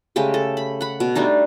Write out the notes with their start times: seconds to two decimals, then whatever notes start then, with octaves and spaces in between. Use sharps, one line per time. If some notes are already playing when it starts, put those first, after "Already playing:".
0.16 C#3 G#3 A3 G4
0.34 A4
0.57 B5
0.81 F#5 B5
1.00 B2
1.15 G3 A3 D4 D#4